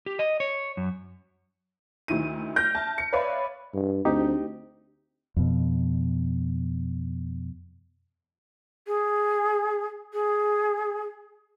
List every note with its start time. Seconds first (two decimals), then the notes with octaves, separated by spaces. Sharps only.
0.06 G4
0.19 D#5
0.40 C#5
0.77 F#2
2.08 D2 D#3 E4 D#7
2.56 F6 G6 A#6 D7
2.75 E5 A5
2.98 C#7
3.13 B4 C#5 D5 E5 F5 B5
3.74 G2
4.05 D2 C4 D#4 G4
5.36 F2 B2
8.87 G#4
10.13 G#4